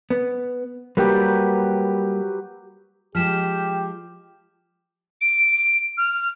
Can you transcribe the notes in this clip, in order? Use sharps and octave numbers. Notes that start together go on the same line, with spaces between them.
B3
F#3 G3 A#3 G4 B4
F3 G#3 G4 F6 B6 E7
D7
F6